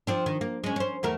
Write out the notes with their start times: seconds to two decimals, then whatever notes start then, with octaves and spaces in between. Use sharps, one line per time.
0.07 F3 C4 D4
0.26 D#3
0.41 A#3
0.64 G#3 C#4
0.76 C#4 C5
1.03 E2 A3 A#4